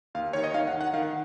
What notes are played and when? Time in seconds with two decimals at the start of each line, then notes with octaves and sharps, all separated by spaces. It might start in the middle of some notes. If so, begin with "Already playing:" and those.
0.15 D#2 F5
0.33 D#3 C#5
0.44 D#5
0.54 D#3 F5
0.67 F#5
0.74 D#3
0.81 F#5
0.94 D#3 F5